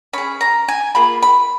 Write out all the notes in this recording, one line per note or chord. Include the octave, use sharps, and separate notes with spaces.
C#4 G#4 B5
A#5
G#5
A#3 F4 G#4 B5
B5